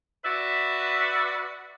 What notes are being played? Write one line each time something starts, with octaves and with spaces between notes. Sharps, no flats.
F#4 B4 D5 E5